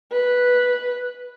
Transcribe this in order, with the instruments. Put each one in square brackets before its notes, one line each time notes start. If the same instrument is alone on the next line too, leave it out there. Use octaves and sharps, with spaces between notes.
[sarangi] B4